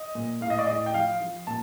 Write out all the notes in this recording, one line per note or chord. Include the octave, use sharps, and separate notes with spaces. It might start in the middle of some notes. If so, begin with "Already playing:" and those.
Already playing: D#5
A#2
A2 F5
D#5
D5
A2 D#5
G5
F3 F5
F3
A#2 A5